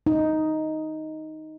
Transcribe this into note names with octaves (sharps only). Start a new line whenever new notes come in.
D#4